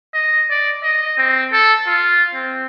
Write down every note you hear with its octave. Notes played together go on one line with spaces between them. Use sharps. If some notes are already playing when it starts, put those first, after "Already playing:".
D#5
D5
D#5
C4
A4
F4
C4